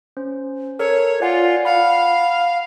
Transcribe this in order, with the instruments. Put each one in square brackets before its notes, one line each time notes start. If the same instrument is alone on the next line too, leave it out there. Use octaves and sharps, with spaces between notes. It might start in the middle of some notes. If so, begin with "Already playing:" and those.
[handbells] C#4 C5
[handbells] A4 A#4 [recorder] C#5
[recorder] F4 [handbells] D5 F#5 G#5
[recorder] F5 [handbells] F#5 B5